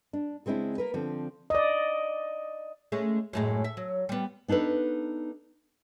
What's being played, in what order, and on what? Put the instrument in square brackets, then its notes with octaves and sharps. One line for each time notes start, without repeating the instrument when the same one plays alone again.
[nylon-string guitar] D4
C#3 G#3 C4 D4 E4
A#3 A#4 B4
D3 F3 C4
[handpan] D5 D#5
[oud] G#3 A3 C#4
F#2 A2 G#3
E5
F#3
G3 B3
[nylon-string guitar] B3 D4 D#4 A4 B4